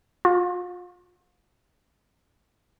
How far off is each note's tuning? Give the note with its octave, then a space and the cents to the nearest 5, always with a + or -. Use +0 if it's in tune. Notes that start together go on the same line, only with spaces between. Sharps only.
F4 +40